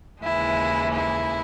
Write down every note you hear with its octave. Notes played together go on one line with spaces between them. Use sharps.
D#2 C#3 E3 G#3 E4
E4